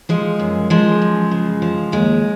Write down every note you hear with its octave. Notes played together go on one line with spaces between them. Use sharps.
F3 G#3
F#2
F3 G#3
F#2
C#3
F3
D#2 G#3